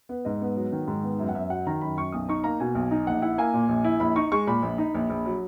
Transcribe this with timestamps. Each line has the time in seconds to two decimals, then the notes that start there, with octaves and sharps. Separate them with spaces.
0.09 B3
0.25 G#2 D#5
0.41 B3
0.56 F#3
0.72 D#3
0.88 G#2
1.03 B3
1.19 F#2 E5
1.29 F#5
1.35 F#2 E5
1.50 F#3 F#5
1.67 D#3 A#5
1.81 F#2 B5
1.97 F#2 C#6
2.12 B1 D#6
2.29 D#4 C#6
2.44 A#3 A#5
2.60 B2 G#5
2.75 B1
2.91 D#4
3.07 A#1 F#5
3.22 E4 F#5
3.38 A#3 G#5
3.54 A#2
3.69 A#1
3.84 E4
4.00 A#1 B5
4.16 D#4 C#6
4.32 G#3 C#6
4.47 A#2 B5
4.63 A#1
4.78 D#4
4.95 A#1
5.10 A#1
5.26 F#3